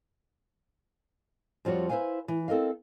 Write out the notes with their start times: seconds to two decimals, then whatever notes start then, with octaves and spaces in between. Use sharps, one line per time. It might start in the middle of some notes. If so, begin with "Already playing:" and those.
1.65 F2 F3 G3 F#4 C#5
1.90 E4 B4 C5 F5 G#5
2.28 E3
2.48 C4 A4 A#4 D#5 F5